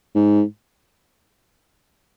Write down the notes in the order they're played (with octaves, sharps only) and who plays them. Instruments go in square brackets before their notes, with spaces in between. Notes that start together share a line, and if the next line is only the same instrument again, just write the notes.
[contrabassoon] G#2